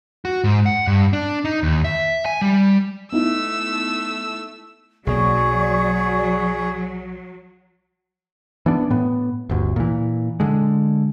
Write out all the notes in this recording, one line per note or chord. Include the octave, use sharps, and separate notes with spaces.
F#4
G#2
F#5
G2
D4
D#4
D#2
E5
G#5
G3
A3 B3 D#4 E4 E6
B1 B2 F#3 A#3 G#4 D5 C#6
E3 B3 D4
A2 B3
G1 D2
A#2 E3
D3 G#3